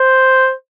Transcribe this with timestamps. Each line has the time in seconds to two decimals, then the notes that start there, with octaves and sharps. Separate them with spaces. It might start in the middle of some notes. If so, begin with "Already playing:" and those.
Already playing: C5